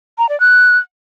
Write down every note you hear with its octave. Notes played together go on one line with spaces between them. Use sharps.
A#5
D5
F#6